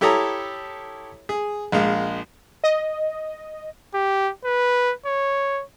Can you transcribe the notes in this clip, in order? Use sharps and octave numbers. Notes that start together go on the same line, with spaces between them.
E4 G4 A4 C#5 A#5 D#6
G#4
A#1 G#3 F5
D#5
G4
B4
C#5